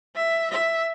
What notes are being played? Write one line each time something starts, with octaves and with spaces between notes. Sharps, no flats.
E5
E5